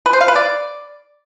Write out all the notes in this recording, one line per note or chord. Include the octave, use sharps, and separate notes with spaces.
B4
C5
F5
B4
D5